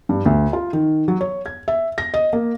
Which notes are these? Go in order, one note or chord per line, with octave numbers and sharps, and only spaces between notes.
G2
D2
F4
D#3
F#3
C#5
G#6
E5
A#6
D#5
A#3